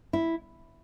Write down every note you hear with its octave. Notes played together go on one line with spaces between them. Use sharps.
E4